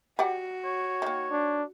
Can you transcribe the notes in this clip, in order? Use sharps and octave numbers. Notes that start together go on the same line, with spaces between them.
F#4 G4 D5 F#5
C#5
D#3 A#3
D4